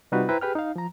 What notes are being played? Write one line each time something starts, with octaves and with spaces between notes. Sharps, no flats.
C3 G3 D#4 F4 F#4 B4
E4 B4 C5 G5 A#5
G4 G#4 B4 G5 F6
D#4 F5
F3 A#5